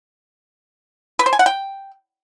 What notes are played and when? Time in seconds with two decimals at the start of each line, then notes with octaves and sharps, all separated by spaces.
1.19 B4
1.26 C5
1.33 G#5
1.39 F#5
1.46 G5